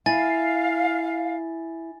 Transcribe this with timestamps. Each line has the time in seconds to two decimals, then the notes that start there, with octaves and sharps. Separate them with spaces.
0.06 E4 F5 G#5 A6